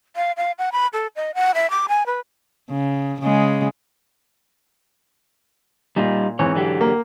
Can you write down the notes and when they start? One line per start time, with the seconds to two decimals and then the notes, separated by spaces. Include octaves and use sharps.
0.16 F5
0.37 F5
0.58 F#5
0.72 B5
0.93 A4
1.16 D#5
1.35 F#5
1.55 E5
1.70 D6
1.89 G#5
2.06 B4
2.70 C#3
3.21 C#3 G#3
5.96 A#2 G3 D#4 F4
6.39 G#2 E3 C4 C#5
6.55 D3 F#3 G4
6.81 A#3